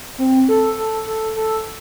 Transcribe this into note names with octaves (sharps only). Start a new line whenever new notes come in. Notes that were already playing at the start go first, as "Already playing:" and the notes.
C4
A4
A4
A4
A4